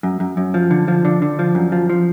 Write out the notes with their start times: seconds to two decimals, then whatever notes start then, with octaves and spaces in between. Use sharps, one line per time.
0.03 F#2
0.20 F#2
0.37 F#2
0.54 F3
0.71 D3
0.88 F3
1.05 D3
1.22 D3
1.39 F3
1.55 F#2
1.72 F3
1.90 F3